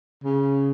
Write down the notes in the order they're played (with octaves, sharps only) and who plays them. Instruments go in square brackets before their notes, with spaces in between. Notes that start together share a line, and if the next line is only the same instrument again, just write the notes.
[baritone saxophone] C#3